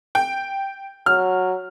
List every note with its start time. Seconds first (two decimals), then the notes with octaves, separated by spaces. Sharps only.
0.15 G5
1.06 F#3 F6